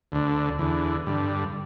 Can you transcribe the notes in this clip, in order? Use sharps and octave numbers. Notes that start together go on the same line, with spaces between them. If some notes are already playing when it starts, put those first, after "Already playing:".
D2 D3
E2 D3
G2 D3